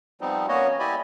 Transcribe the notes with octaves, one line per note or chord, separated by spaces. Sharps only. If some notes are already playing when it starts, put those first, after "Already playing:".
F3 G3 B3 C4 D#4
A#3 B3 C#4 F#4 C#5 D#5
E4 G4 D5 D#5 G#5 B5